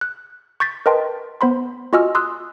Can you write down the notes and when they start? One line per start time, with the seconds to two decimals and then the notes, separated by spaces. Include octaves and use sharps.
0.01 F#6
0.60 C#6 G6 A6 B6
0.86 A#4 B4 D#5 G5 A5 C6
1.41 B3 C5 B5 C6
1.93 F4 F#4 D#5 G#5 E6 F6
2.15 C6 D#6 E6 F#6